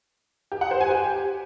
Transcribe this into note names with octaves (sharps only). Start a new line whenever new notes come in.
G4
F#5
C5
G#5
G4